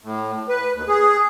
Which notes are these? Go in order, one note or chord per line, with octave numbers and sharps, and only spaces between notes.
A2
B4
D#2
G#4